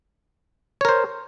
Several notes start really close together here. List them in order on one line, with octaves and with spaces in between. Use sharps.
C#5 A#4 C5